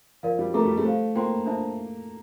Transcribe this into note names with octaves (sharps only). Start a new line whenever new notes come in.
F3 A#4 D5 F5
G3
A3 A#4 E5 A#5 D6
G3
A3
A4 C5 F5
A#3 F4 C5 G5 C6
D4 F4 C5 E5 A5